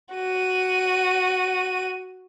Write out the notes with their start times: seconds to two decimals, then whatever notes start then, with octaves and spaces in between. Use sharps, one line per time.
0.15 F#4 D#7